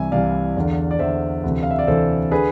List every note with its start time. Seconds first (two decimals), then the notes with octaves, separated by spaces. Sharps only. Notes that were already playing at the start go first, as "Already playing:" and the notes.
Already playing: C2 C3 E3 E5 G#5
0.12 C2 C3 E3 D5 F5
0.56 E2 D3
0.91 D5
0.99 E2 D3 C5 E5
1.43 D2 C3 E3
1.63 F5
1.71 E5
1.79 D5
1.87 D2 C3 E3 A4 C5
2.31 D3 G#4 B4